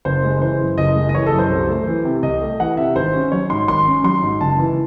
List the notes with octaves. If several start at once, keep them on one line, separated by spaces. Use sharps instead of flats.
F#1 C5
G#3
E3 C5
F#2
F#1 D#5
G#3
D#5
E3 C#5
A4
F#2
C5
C2
A3
E3
C3
C2 D#5
A3
E3 F#5
C3 E5
G#1 C5
C#4
F#3 C#5
G#2 C6
G#1 C6
C#4
F#3 C6
G#2
F#1 A5
E3